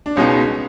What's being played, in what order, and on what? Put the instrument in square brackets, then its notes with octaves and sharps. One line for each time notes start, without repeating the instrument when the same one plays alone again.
[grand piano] D4
[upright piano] C#2 B2 G#3 B3 D#4 [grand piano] C#4